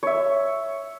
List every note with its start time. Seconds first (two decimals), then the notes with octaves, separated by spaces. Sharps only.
0.03 C#5 E5